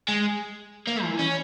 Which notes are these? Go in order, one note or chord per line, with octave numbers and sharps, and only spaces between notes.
G#3
A#3
E3
C#4